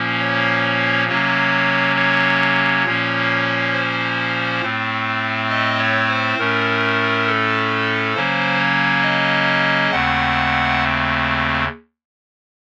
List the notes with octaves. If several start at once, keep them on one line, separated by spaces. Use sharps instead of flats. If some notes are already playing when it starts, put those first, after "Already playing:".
Already playing: A#2 F3 A#3 C#4
C#5
C3 F#3 A#3 C#4 C#5
C#5
A#2 F3 A#3 C#4
C5
A2 A3 C4
D#5
C#5
C5
A2 A3 C#4 A#4
A4
C#3 F#3 A#3 C#4 C5
C#5
D#5
D#2 C#3 A3 C4 F#5